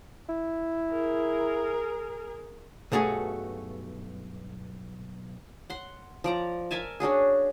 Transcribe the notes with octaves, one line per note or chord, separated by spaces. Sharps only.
E4
G#4 A#4
B1 G2 A3 F#4 G#4 G#5
F#5 C6
F3 D5 A#5
A#4 E5 G#5 A5
C#4 D4 F#4 G#4